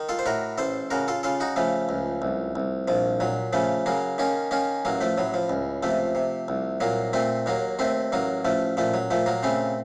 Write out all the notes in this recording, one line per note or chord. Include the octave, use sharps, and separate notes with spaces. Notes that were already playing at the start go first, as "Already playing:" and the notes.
Already playing: D#3
F4 A4
C5
A2 F#4 A#4
A1 A4 C5
C#3 F#4 A#4
F4 A4
C#3 F4 A4
D#4 F#4
C#3 F3 A3
C#2
C2
C2
A#1 F3
A#2 F#3
C#3 F3 A3
C#3 F#3 A#3
D#3 A#3 C#4
D#3 A#3 C#4
A1 F#3 A#3
F3 A3
A2 F#3
F3
C#2
C3 F3 A3
C3
C2
A#2 F#3 A#3
A#2 A3 C4
D#2 F#3 A#3
D#2 A3 C4
A1 F#3 A#3
A1 F3 A3
A#2 F3 A3
F#3
A#2 F3 A3
F#3 A#3
C#3 A3 C4